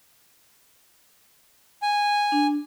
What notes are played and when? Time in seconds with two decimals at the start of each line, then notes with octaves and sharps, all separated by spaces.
1.82 G#5
2.32 D4